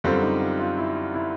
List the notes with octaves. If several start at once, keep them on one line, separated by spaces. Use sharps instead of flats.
F#2 D3 G3 C4 F4
D#4
F4
F4
E4
E4